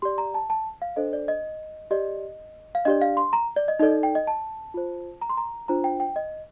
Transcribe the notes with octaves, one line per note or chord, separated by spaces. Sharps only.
G4 D5 C6
A#5
A5
A5
F5
D4 A4 C5 D#5
D5
D#5
G4 D5 D#5
F5
D4 G4 D5 D#5
F5
C6
A#5
D5
D#5
D#4 A4 D5 D#5
G5
D#5
A5
F4 C5
A#5
C6
A#5
D4 F4 C5 A#5
G5
G5
D#5